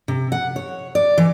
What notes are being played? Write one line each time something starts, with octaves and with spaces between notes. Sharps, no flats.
C3
F#5
C#5
D5
E3